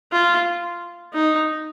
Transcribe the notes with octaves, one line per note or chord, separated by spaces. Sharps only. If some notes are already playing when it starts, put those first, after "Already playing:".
F4
D#4